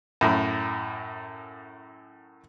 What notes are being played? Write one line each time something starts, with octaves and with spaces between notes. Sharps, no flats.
F#2 A2